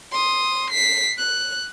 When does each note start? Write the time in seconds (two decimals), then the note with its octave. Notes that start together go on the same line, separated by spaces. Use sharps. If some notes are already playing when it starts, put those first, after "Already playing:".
0.12 C6 D#6
0.71 B6 C7
1.18 F#6